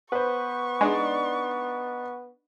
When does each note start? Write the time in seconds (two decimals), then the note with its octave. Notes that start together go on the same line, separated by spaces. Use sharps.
0.12 B3 B4 C5 C#6
0.81 G#3 D4 D#4 D5